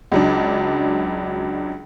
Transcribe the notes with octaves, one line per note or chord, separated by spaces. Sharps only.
C#2 F#3 D4